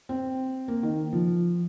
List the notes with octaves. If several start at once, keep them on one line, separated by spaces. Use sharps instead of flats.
C4
A#3
D#3
F3